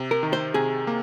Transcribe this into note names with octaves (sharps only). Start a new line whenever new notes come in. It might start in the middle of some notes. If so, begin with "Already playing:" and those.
Already playing: C3
A#4
D#3
C5
C3 G#4
A#3